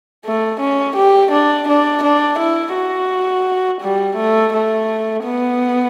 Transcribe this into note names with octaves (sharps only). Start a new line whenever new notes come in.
A3
C#4
G4
D4
D4
D4
E4
F#4
G3
A3
A3
B3